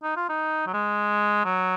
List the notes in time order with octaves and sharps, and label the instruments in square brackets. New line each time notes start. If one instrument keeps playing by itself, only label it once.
[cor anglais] D#4
F4
D#4
F#3
G#3
F#3